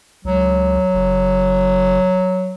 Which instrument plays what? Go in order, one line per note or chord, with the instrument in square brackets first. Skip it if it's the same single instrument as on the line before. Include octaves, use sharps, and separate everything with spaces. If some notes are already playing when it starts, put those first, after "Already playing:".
[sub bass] C#2 [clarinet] F#3
[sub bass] F#1